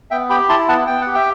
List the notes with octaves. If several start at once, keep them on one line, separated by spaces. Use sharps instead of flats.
B3 E5 G5
G4 G5 B5
E4 A5 C6
B3 F#5 A5
B3 G5
F#5
G4
E5 G5